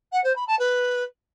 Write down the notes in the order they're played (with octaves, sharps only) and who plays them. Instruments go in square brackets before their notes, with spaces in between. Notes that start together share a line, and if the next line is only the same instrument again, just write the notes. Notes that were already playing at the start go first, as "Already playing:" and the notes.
[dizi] F#5
C5
B5
A5
B4